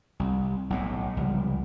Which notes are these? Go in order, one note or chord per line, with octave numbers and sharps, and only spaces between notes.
C2
B1 A2
C#2 C3 F3 G3